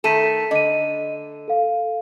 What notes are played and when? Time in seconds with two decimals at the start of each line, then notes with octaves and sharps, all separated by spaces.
0.04 D#3 A3 A4 B6 D#7 E7
0.51 D3 D#5 D#7
1.48 A4 F5